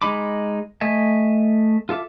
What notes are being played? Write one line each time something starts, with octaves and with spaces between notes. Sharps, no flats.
G#3 D#4 B5 D6
A3 D#5 E5 G#5
F4 A4 E5 D6